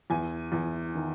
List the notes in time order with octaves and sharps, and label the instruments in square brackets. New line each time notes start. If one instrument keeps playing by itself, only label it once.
[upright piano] E2 G#5
E2
D#3